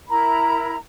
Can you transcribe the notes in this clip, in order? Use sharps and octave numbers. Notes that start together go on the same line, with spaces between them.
E4 A#4 A#5 B5